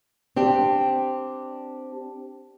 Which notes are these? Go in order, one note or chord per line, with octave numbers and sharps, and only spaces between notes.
C4 D4 G4